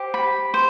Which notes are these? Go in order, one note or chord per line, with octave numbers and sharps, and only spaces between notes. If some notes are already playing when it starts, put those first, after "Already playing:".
Already playing: G4 C5
B5
C5